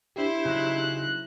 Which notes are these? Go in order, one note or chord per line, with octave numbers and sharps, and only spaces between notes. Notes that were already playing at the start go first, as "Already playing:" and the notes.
D4 E4 G4 C5
C#3 F#3 D#4 F#6